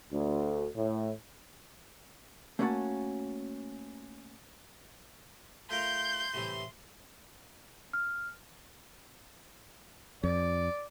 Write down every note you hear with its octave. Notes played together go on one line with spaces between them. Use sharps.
D2
A2
A3 A#3 C#4 E4 F#4 A5
A3 F4 A#4 C6 G6
A2 C3 E3
F6
F2 D5